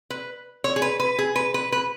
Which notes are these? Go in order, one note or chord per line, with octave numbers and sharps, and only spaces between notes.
B4
C#5
G#4
B4
B4
G#4
B4
B4
B4